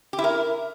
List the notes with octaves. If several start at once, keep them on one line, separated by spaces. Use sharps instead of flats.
G4
E4
A#4